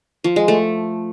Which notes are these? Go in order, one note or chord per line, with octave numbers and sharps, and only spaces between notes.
F3
G#3
A3